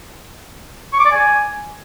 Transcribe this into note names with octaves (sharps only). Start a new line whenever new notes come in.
C#6
D6
D5
G#5